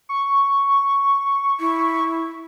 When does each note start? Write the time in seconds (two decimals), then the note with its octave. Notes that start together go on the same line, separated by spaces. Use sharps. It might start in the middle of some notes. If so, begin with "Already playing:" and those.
0.09 C#6
1.60 E4